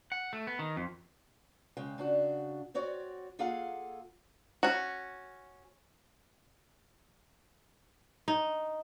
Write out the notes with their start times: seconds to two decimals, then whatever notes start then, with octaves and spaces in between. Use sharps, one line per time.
0.12 F#5
0.33 A3
0.47 B3
0.59 D#3
0.76 F2
1.77 C#3 G#3 G5
1.98 C#3 D4 F#4
2.74 C4 F#4 C#5 D5
3.39 A#3 F4 G#4 A4 F5 F#5
4.63 C#4 F#4
8.28 D#4